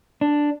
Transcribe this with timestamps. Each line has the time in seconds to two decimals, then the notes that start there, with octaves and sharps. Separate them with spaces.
0.21 D4